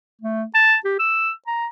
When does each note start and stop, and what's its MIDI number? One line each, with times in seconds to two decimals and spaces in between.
0.21 0.44 57
0.54 0.76 81
0.85 0.97 67
0.99 1.32 88
1.47 1.67 82